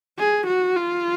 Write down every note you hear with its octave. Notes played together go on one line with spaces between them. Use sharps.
G#4
F#4
F4